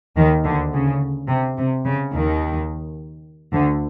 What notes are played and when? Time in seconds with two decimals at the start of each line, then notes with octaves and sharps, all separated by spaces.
0.17 D#2 D#3
0.44 D2 D3
0.73 C#3
1.28 C3
1.57 C3
1.85 C#3
2.13 D#2 D#3
3.53 D2 D3